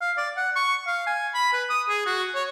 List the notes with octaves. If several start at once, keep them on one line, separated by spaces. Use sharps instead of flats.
F5
D5
F#5
C#6
F5
G#5
B5
B4
D#6
G#4
F#4
C#5